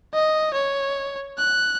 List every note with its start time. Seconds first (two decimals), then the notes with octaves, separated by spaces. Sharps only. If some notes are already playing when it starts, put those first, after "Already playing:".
0.14 D#5
0.53 C#5
1.38 F#6